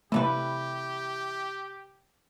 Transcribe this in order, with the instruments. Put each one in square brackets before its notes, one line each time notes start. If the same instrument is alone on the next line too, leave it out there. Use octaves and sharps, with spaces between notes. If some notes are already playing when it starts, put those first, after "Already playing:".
[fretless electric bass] C3 A3 [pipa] E3 G3 B4 [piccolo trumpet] G4